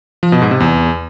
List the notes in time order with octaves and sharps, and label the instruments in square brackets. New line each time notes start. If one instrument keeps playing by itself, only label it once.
[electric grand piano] F3
B2
G#2
C3
E2